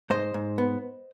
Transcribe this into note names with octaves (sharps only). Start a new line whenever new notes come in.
G#2 C5 D#5
G#2
B3